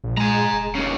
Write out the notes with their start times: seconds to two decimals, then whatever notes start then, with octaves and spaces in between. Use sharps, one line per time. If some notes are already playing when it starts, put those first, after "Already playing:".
0.04 A#1 A#2
0.17 G#3 G#5 A#5
0.53 F1
0.75 D#2 C#3